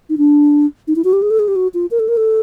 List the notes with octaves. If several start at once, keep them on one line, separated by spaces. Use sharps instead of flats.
D#4
D4
D#4
E4
F#4
G4
G#4
A4
G#4
G4
F#4
F4
A#4
A4
A#4
A4